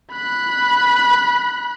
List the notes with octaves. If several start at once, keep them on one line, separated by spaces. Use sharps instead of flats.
B5 F#6